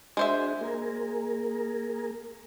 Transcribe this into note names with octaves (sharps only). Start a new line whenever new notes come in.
G#3 D4 F#4 G#4 C5 E5
A#3 G#4 A#4